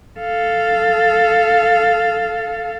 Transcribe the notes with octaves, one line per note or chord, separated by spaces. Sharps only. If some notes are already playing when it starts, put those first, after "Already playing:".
A4 F5